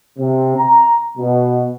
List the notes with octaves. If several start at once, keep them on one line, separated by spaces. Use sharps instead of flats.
C3
A#5
B2